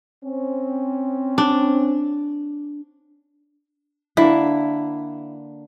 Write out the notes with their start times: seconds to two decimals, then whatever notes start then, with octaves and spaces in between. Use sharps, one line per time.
0.24 C4 C#4
1.38 D4
4.17 D3 A#3 E4